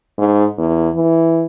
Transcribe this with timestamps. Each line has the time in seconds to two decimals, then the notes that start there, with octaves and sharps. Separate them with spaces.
0.18 G#2
0.58 E2
0.95 E3